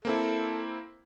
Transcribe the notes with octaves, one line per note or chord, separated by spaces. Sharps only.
A#3 C4 E4 A4